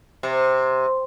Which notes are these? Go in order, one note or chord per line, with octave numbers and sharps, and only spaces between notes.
C3